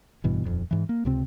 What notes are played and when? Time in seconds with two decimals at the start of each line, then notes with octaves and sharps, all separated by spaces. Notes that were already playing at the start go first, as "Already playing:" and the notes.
0.24 A1 G2 B2 E3
0.44 D#1 F2
0.71 G#2 E3
0.89 A#3
1.05 C#2 C3 C4